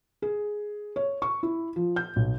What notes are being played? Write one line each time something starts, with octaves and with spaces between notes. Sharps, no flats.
G#4
C#5
C#6
E4
F3
G6
B1